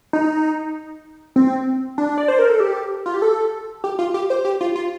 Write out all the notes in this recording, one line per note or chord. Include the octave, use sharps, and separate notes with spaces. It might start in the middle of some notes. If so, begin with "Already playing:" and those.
D#4
C4
D4
D5
C5
A#4
A4
G4
F4
G4
A4
G4
F4
G4
C5
G4
F4
F4